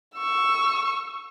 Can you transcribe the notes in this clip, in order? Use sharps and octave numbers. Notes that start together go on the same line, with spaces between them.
C#6 E6